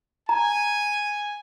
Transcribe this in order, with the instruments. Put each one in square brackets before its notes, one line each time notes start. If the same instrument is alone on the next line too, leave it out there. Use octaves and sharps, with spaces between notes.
[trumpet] G#5 [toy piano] A#5